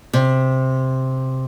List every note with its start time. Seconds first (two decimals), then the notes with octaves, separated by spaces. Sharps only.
0.13 C3